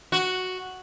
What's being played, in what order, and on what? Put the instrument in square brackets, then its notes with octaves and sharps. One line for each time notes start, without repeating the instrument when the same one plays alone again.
[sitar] F#4